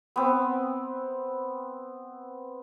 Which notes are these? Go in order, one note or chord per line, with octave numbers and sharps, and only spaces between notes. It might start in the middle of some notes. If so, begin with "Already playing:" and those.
B3 C4